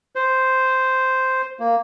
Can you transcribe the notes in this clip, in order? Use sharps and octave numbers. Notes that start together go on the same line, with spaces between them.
C5
A#3